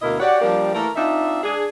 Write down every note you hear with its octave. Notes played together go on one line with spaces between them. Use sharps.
D2 B2 A#3 E4 A#4 D#5
F#4 G4 C#5 D5 F#5
F3 G3 A#3 D4 G4 A#4
E3 A3 A#3 A#4
C4 D4 D#4 F4 E5
D4 G#4